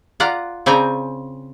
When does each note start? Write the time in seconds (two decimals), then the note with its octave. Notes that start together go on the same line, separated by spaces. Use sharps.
0.20 F4 D5 F#5 A#5
0.66 C#3 C4 D5 G5 G#5 A#5